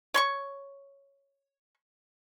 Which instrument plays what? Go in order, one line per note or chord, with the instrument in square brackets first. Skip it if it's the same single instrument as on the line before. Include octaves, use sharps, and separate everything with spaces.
[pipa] C#5 C6 C#6